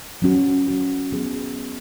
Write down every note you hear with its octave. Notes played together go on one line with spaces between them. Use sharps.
F#3 C#4 F#4
F#3 C#4 F#4
F#3 B3 G#4